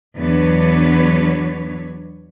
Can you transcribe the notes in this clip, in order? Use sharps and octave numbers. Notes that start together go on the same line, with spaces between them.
E2 F#3 B3 D4 B4 C#5